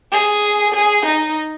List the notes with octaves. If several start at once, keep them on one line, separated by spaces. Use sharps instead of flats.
G#4
G#4
D#4